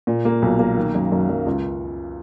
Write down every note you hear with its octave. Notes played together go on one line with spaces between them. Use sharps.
A#2
A#3
B1
A#3
D#3
F#2
F#2
F#2
C#2